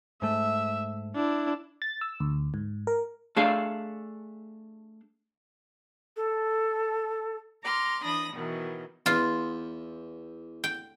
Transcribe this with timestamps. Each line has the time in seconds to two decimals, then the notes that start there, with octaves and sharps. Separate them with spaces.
0.22 G#2 A3 E5
1.15 D4 E4
1.82 A6
2.01 E6
2.20 D2
2.54 G#2
2.87 A#4
3.36 A3 D4 G#4 F5
6.16 A4
7.62 A#5 C6 D6 F6
8.03 E3 D4 B5 D#6 A#6
8.32 B2 D#3 E3 F#3
9.06 E2 F4
10.64 G5